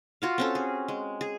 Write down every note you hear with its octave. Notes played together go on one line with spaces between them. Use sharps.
F4 F#4 F5
C4 C#4 A4
G#4
G#3
G#4